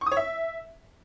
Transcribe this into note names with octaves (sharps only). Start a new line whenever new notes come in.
C#6
D#6
C#5
E5